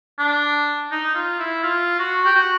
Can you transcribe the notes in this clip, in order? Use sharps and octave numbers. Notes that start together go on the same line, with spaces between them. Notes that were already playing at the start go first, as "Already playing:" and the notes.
D4
D#4
F4
E4
F4
F#4
G4
F#4